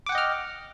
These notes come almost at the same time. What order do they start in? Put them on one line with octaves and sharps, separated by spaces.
D6 F#5 G5 D#5 F6